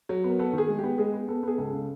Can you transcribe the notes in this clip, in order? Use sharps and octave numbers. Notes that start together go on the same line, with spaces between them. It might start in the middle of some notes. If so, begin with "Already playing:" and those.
F#3
B3 A#4
B3 A4
D#3 G#4
G#3
G4
B3
G#3 G#4
B3
B3 A4
B3 G#4
C#2 A4
C#3